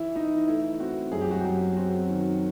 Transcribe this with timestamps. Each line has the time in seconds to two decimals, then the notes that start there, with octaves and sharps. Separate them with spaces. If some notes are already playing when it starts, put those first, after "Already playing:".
Already playing: E3 E4
0.16 E3 D#4
0.48 A3 E4
0.80 C4 F#4
1.12 F#2 G#4
1.21 G4
1.31 F#4
1.40 F#2 G4
1.76 C4 F#4
2.09 D#3